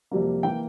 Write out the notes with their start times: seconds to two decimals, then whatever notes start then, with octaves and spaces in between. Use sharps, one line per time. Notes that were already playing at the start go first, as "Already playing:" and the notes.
0.11 F2 C3 G3 A#3
0.43 E3 A#3 G5